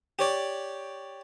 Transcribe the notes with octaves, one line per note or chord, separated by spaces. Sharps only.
G4 C#5 D5